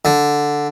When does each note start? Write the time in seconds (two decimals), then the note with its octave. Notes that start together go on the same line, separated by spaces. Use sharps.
0.05 D3